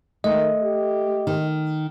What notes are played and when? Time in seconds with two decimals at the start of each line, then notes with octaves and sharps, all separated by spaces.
0.24 D#3 A3 D#5
0.63 G4
1.27 D#3